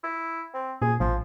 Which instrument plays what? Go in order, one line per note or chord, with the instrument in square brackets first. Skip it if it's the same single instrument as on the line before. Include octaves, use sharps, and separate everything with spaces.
[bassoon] E4
C4
[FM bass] A#2 [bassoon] G#4
[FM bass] A1 [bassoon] F3